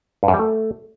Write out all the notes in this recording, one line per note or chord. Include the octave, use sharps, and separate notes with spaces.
G2
F#2
G3
A3